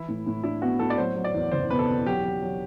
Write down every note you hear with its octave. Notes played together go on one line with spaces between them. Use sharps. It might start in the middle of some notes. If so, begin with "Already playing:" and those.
Already playing: E3 E4
A2
A2
D4 E4
B3 F#4
A2 A4
D5
F#3 C5
F#3
D5
E2
F#1 C5
B2 B4
A4
E2
F#3 G4
F#3
F#3